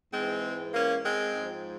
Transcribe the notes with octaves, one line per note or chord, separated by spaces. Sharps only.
G#2 E3 G#3 C4
A#3 C#4
G#3 C4
G#2
F3